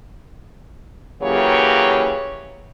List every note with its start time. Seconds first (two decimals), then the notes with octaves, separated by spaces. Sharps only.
1.21 C#3 E3 F#3 A#3 G4 C#5